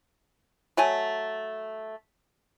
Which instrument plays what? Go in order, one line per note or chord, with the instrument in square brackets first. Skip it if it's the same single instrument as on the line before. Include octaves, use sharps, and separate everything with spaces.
[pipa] F#3 A3 G#5